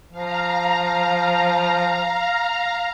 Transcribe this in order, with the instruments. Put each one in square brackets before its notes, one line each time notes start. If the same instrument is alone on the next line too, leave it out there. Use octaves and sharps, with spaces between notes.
[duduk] F3 [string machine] F5 A#5